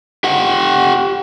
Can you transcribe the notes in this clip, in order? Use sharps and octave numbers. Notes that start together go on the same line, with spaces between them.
G4 F#5